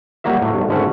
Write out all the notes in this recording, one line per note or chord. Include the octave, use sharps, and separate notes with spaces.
F#3 G3 A#3 F#4 E5
A2 F#3
B1 G2 F#3
G#1 D3 A3 C#4 E5 F#5